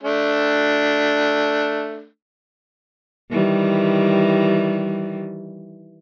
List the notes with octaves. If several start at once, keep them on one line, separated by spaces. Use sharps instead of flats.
A3 D4
D#3 E3 G3